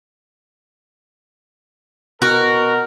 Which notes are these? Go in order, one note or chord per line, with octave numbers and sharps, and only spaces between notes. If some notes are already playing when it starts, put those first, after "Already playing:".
B2 F#4 A#4